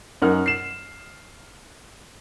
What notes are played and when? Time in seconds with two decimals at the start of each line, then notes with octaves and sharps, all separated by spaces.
0.22 F#2 D#4 A#4 F#5 F6
0.46 C7 E7